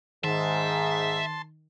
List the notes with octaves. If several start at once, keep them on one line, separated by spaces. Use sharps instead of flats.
G#2 D#3 E5 A5 C6